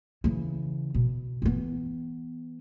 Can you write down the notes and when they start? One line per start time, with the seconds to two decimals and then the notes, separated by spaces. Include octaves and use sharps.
0.24 C#3 E3
0.94 B2
1.42 E3 B3